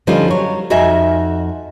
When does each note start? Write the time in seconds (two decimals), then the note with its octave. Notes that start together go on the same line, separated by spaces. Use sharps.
0.07 D3 F3 G3 C#4 D#4 F4
0.30 F#3 C#5
0.70 F2 D#4 F#4 E5 G#5